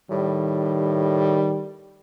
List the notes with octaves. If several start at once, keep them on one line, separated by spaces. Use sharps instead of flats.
A2 D#3 G3